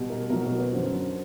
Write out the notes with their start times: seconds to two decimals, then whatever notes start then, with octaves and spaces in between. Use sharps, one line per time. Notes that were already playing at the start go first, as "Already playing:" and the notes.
Already playing: B2 G3
0.10 A#4
0.30 B2 F#3 A#4
0.44 A#4
0.58 B4
0.72 F#2 D3 F#3 C5